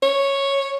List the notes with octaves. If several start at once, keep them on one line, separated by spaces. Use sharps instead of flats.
C#5